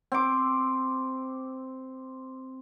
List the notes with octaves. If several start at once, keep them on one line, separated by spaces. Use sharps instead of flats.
C4 D6